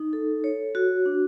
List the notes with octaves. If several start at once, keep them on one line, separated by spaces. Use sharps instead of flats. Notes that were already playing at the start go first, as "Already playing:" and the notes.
Already playing: D#4
A4
C#5
F#4
D4